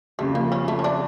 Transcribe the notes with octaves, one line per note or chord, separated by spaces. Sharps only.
F2 C#3 G3 A3
A#3
C#4
A3
C#4
D4